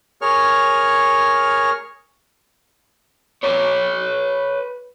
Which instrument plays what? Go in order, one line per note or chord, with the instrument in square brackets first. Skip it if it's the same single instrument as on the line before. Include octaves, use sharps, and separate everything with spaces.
[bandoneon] G#4 A#4 C#5 C#6 F6
[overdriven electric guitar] B4 C#5